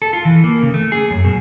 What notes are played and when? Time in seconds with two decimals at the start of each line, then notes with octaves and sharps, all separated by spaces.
0.02 A4
0.13 F4
0.25 E3
0.44 A#3
0.62 C#3
0.74 A3
0.92 G#4
1.11 F#2
1.25 B2